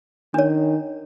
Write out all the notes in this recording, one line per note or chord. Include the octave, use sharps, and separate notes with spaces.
D#3 D4 C#5